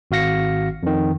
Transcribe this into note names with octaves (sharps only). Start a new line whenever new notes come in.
G#1 F#4 F5 A#6 C#7
F2 D#3